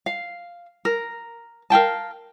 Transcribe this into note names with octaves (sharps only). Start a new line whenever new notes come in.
F5
A#4
A#4 F5 G5 A5